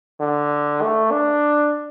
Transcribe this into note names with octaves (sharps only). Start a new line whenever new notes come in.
D3
A3
D4